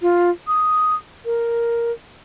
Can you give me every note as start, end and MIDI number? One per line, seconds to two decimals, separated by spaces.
0.02 0.30 65
0.47 0.95 87
1.25 1.92 70